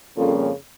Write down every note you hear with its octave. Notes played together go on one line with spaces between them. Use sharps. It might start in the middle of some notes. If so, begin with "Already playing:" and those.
F2 C#3 G3 A#3 C#4 F4 A4